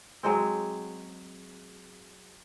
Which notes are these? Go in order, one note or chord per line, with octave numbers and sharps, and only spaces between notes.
F#3 G#3 C4